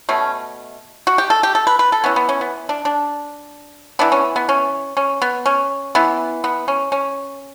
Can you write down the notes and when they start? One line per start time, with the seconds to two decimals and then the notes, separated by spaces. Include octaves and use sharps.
0.09 B2 A3 C#4
1.07 F#4
1.18 G4
1.30 A4
1.43 G4
1.55 A4
1.67 B4
1.79 B4
1.92 A4
2.04 E3 B3 C#4
2.16 B3
2.29 C#4
2.41 B3
2.69 D4
2.85 D4
3.99 E3 B3 D4
4.12 C#4
4.36 B3
4.49 C#4
4.97 C#4
5.22 B3
5.46 C#4
5.95 E3 B3
6.44 B3
6.68 C#4
6.92 C#4